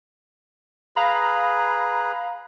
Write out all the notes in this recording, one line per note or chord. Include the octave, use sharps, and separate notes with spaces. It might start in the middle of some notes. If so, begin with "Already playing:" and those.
G#4 B4 F5 A#5 B5